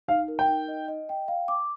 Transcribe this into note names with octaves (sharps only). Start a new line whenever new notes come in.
D#4 F5
A#4
G5
D#4
D#5
D#5
G5
F5
D6